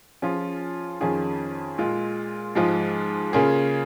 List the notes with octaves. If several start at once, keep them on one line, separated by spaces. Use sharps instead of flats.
F3 C#4 F4 G#4
F2 D#3 C#4 F4 G#4
A#2 G#3 F4
G#2 F3 G#3 F4 G#4
C#3 A#3 C#4 F4 G#4